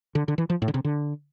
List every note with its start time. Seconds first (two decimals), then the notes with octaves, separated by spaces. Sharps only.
0.15 D3
0.28 D3
0.38 E3
0.50 F3
0.62 A2
0.68 D3
0.74 C3
0.85 D3